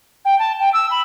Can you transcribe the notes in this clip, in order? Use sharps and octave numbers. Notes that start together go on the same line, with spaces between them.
G5
A5
G5
E6
B5